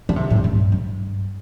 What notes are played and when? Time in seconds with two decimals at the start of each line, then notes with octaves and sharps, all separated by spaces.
0.09 D3
0.16 C3
0.30 A2
0.44 G2
0.72 G2